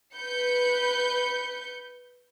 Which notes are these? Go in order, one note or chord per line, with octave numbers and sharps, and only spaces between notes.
B4 G6 C#7